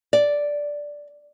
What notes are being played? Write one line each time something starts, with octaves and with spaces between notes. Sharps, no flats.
D5